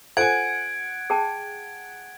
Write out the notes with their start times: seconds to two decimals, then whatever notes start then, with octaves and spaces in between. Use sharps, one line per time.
0.17 F4 A4 C5 F#5 G#5 G#6 D7
1.10 G#4 G5 A5